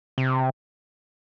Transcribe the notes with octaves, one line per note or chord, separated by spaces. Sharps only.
C3